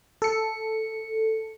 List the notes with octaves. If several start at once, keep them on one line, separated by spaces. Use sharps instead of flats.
A4 C#7